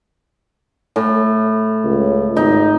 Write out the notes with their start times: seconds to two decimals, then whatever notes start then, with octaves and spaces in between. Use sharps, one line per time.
0.96 A2
1.85 C#2
2.36 G#1 D#4